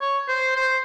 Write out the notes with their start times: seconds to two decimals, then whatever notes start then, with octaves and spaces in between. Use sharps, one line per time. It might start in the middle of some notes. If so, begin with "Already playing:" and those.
0.01 C#5
0.28 C5
0.56 C5